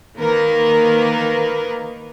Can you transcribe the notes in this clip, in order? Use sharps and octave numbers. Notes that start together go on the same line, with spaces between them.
D#3 A#3 A#4 B4